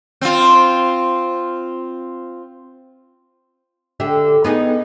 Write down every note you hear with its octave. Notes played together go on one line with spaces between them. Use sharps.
C4 F4
D3 G4 E5
B3 D#4 G#4